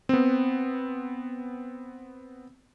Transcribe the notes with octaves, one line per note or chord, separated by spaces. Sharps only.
B3 C4